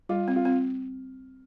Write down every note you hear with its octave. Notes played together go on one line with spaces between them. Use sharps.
G3 F4
C4
F4
C4